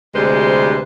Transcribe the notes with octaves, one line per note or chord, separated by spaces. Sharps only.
D2 C3 G3 G#3 B4 C5